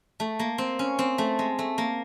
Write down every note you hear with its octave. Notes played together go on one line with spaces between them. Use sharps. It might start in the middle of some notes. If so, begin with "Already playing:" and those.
A3
A#3
C4
C#4
C4
A3
G#3
A3
A#3